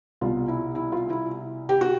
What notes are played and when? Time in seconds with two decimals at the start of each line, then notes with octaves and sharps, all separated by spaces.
0.21 C2 B2 F4
0.48 E4
0.75 E4
0.92 F4
1.10 E4
1.69 G4
1.81 F#4